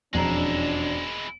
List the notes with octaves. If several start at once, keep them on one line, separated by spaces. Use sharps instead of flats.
E1 F2 F3 G#3 C#4 D4 E4 A#5